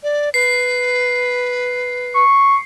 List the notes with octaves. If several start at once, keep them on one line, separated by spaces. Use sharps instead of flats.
D5
B4 C7
C#6